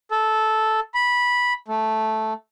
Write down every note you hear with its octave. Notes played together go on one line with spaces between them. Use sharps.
A4
B5
A3